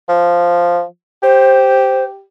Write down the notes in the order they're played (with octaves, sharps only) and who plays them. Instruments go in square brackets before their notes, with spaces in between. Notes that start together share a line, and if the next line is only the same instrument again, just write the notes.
[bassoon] F3
[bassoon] G4 [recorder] C5